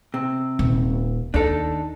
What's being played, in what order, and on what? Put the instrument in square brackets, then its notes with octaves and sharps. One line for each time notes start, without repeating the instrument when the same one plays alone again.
[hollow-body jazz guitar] C3
[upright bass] D#1
[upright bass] D#2 [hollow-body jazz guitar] D4 D#4 A4